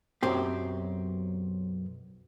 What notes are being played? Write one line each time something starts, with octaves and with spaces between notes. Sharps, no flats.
B1 F#2 F#3 C4 G4